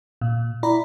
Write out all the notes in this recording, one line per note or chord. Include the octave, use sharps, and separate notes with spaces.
A#2
E4 D5 A#5 B5